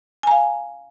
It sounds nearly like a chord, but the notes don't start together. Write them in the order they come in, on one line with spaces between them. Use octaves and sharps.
G#5 A#5 F5